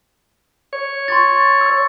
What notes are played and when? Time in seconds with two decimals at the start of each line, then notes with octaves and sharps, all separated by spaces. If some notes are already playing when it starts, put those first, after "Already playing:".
0.73 C#5
1.08 C6 C#6 A6
1.25 C6
1.61 E6